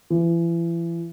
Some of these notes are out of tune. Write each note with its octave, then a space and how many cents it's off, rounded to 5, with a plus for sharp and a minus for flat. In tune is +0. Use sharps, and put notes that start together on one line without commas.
E3 +35